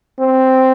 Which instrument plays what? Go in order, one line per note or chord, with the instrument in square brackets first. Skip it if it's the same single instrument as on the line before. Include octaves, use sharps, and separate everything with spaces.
[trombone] C4